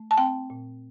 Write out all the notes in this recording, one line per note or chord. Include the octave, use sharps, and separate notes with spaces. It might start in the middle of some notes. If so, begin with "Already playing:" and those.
Already playing: A3
A5
C4 G5
A#2